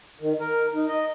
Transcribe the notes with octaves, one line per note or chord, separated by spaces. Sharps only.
D#3
A#4
D#4
D#5